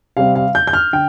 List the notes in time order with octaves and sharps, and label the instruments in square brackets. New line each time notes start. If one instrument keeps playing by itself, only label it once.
[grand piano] C3 G3 C4 F5
F5
G6
G6
F6
D3 G5